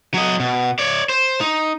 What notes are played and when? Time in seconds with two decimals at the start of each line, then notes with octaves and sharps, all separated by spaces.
0.14 F#3 D#5
0.40 B2
0.79 C#5 D5
1.09 C5
1.41 D#4